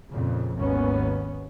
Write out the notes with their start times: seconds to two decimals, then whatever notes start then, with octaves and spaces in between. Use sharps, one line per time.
0.10 F2 A#2 C#3
0.56 G#1 D#2 B3 C#4